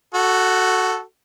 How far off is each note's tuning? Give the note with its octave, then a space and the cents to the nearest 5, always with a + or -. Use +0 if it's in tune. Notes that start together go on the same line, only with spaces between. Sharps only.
F#4 +0 A4 +0 F#5 +40